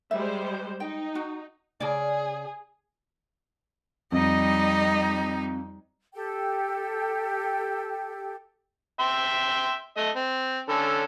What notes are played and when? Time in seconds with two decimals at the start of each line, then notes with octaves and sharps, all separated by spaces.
0.11 G3 G#3 C5 E5
0.80 D#4 G5
1.15 F#4
1.80 C#3 G#4 D5
4.12 F2 G3 D#4 D#5
6.14 G4 A4 G5
9.00 E5 G5 C6
9.97 A3 D#5
10.16 C4
10.69 D3 C#4 A4